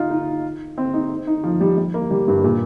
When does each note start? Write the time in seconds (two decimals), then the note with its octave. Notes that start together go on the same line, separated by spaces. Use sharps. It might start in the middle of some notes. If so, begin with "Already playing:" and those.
Already playing: D#4 F4
0.11 D#4
0.78 C4
0.93 D#4
1.27 D#4
1.44 F3
1.61 G3
1.78 G3
1.94 A#3
2.11 G3
2.28 G2
2.44 A#2